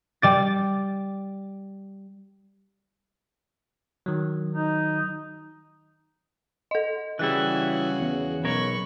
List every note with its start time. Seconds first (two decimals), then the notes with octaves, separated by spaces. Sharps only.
0.22 G3 D5 A6
4.06 D#3 F#3
4.52 D#4
6.71 A4 D#5
7.19 C#3 E3 G3 E4 F#4 G#4 F#6
8.00 E2
8.44 B1 A#4 C#5 B5 C#6